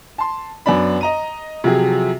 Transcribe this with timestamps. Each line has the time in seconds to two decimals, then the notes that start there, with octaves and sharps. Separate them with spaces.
0.18 A5 C6
0.66 F#2 B3 D4 B5
1.01 D#5 A#5 D#7
1.64 C3 F3 F#3 G4 G#4